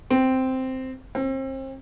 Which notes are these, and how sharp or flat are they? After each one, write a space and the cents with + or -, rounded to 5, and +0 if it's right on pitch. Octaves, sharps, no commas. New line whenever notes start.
C4 -5
C4 +35